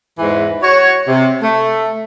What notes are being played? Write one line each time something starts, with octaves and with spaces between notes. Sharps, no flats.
E2 G#2 E3
F#4 C#5
C3
A3